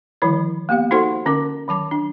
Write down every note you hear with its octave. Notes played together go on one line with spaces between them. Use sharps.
D3 D#3 F3 G3 E4 C#5
A#3 B3 G4 F5
D#4 F#4 A4 C5 F#5 C6
D3 C#4 A#4 D6
D#3 F#3 A5 D6
D4